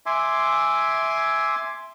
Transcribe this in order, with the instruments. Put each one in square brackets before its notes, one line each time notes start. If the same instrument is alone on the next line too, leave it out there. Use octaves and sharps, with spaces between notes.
[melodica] E5 G#5 C6 D6